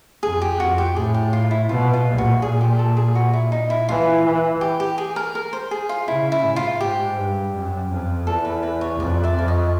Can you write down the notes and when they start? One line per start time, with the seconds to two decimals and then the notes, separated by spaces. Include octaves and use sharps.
0.23 F2 G#4
0.42 G4
0.60 F2 F#4
0.78 G4
0.96 A2 G#4
1.14 G4
1.33 F4
1.51 E4
1.69 B2 F4
1.94 F4
2.06 A#2
2.18 F#4
2.42 G#4
2.61 G4
2.79 A4
2.97 G#4
3.15 F#4
3.33 E4
3.52 D#4
3.70 E4
3.89 E3 F4
4.25 E3
4.61 G4
4.80 G4
4.98 G#4
5.16 A#4
5.35 A#4
5.53 C5
5.71 G#4
5.89 F4
6.08 C#3 E4
6.32 E4
6.44 G#2
6.56 F4
6.81 G#2 G4
7.17 G2
7.54 F#2
7.91 F2
8.27 E2 A4
8.45 B4
8.63 B4
8.81 C#5
8.99 F2 D5
9.24 D5 E5
9.36 F2 D5
9.48 C#5 D#5